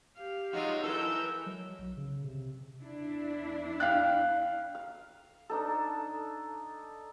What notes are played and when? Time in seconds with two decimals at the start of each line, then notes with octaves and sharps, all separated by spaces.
0.17 G4 F5
0.53 F#3 G#3 D#4 F4 F#4
0.84 E3 A4 A#4 E6 G6
1.46 F#3
1.79 B1
1.97 C#3
2.24 C3
2.82 E2 D4 E4
3.80 F5 G5 F#6
4.75 F5
5.50 D4 D#4 A4